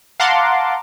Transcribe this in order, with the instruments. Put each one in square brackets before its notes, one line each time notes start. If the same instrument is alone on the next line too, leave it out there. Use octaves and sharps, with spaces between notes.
[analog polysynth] F5 F#5 A5 A#5 C6 D6